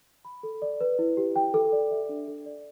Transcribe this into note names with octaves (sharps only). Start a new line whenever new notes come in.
B5
A4
D5
B4
E4
G4
G5
A4
D5
E5
D4
A4
D5